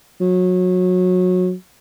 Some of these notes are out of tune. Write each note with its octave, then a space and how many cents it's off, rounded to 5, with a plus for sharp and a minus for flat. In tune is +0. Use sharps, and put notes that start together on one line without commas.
F#3 -25